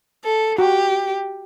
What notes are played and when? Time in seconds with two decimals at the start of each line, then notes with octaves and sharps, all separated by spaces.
0.24 A4
0.58 F#4 G4